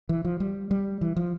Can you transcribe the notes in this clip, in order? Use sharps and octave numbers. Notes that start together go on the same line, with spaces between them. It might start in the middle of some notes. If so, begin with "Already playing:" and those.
E3
F3
G3
G3
E3
F3